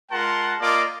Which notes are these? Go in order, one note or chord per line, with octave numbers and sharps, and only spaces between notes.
G#3 F4 A#4 F#5 A5 C6
A#3 F4 A#4 D5 D#5 D6